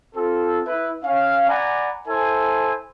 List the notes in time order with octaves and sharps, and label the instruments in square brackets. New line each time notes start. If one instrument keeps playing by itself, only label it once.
[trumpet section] C4 F4 A4
E4 B4
C#4 F5
D5 F#5 G#5 A#5 B5
E4 A4 C5 G#5